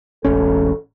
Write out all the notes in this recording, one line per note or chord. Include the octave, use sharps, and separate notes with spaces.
E1 A1 C#4 A4